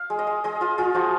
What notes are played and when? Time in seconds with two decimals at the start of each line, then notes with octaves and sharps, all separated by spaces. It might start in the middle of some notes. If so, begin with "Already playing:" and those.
Already playing: F5
0.10 G#3
0.19 D#5
0.27 G#3
0.44 G#3 D#5
0.61 F4 D#5
0.78 G#3 F4
0.94 F3 F#4